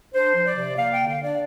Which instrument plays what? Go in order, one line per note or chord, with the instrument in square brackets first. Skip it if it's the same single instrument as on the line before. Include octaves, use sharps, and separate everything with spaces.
[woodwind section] D4 C5
F3
D5
C3
A#3 F5
G5
D3
F5
D4 D5